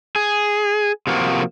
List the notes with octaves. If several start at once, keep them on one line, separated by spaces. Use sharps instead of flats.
G#4
C3 F3 A#3 F#4